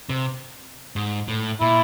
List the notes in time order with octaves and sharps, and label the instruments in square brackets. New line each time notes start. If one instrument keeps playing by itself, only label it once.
[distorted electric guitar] C3
G#2
A2
[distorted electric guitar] A#2 [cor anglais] E4